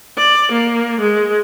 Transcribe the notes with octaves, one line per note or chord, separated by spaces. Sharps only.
D5
A#3
G#3